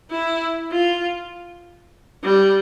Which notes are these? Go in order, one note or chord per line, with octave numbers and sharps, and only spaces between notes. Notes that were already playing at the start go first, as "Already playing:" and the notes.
E4
F4
G3